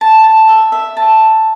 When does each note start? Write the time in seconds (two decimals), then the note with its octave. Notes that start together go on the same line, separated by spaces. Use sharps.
0.01 A5
0.24 A5
0.49 E5
0.72 E5
0.97 A5